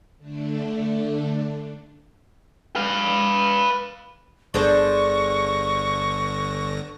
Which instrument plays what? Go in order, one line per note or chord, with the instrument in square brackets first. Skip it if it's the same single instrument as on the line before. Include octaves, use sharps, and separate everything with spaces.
[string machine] D3 A3 D4
[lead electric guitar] B4 F5
[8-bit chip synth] G1 D3 A#6 [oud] D4 G#4 C5 [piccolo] C#6